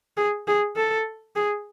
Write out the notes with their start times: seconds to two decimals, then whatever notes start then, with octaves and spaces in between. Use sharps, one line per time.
0.17 G#4
0.48 G#4
0.76 A4
1.36 G#4